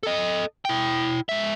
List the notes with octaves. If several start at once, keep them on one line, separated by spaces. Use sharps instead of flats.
A4 D#5
E4 G5
G#3 E5